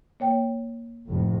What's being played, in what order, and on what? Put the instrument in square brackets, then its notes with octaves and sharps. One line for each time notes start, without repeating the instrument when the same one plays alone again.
[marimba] A#3 C#5 G5
[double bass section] F1 A2